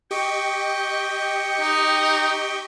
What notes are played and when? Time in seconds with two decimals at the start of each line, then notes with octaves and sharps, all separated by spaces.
0.11 G4 D#5 G5 C#6
1.61 D#4